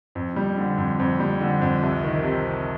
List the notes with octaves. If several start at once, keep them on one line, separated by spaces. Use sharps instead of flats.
F2
G3
D3
F2
F2
G3
D3
F2
C2
D#3
C3